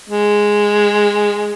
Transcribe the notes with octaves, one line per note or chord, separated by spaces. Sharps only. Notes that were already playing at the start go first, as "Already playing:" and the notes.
G#3